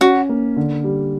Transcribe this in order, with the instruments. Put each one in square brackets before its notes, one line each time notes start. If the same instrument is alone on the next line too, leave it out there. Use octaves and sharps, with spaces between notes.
[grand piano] C#4 [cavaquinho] F#4
[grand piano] A#3
D3
G3